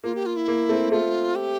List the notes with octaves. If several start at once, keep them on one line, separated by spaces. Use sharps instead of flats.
A#3 F4
G4
F4
E4
A#3
A3 C4
A3 C4 F4
G4